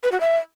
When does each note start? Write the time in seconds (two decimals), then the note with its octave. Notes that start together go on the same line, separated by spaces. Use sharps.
0.03 B4
0.12 F#4
0.20 E5